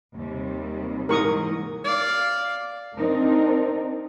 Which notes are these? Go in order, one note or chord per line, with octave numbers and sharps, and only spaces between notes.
D#2 C3 G3
G#2 E3 A#4 C#6 D#6
D5 F5
C4 D4 D#4 A#4